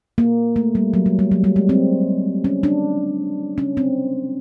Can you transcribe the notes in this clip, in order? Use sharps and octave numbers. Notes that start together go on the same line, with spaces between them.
A#3
A3
G3
F#3
G3
G3
F#3
G3
G#3
C4
C#4
D4
C#4
C4